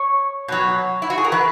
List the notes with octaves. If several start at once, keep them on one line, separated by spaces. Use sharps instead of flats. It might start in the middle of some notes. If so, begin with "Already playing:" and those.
Already playing: C#5
B2 F#3
E4
F#4
G#4
A#4
E3 B4